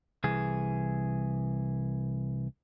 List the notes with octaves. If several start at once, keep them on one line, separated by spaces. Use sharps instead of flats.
C2 E3 G#4